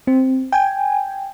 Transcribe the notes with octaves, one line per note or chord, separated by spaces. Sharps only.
C4
G5 G#5